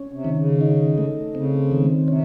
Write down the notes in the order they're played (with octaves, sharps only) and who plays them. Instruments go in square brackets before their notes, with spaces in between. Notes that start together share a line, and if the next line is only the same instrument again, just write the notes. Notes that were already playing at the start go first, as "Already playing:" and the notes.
Already playing: [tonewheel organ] C#4
[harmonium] C3
[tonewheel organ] D#3
[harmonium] C#3
[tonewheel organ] D#4
A3
[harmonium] C#3 [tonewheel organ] C4
[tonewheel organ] D#3
[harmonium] C3 [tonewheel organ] C#4